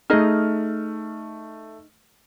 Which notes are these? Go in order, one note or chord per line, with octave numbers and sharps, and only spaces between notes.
A3 D#4 G#4 D#5 F6